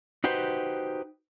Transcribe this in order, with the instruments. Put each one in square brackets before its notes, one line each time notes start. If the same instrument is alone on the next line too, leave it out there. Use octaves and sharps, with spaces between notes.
[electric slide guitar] D#4 F#4 G4 B4 C5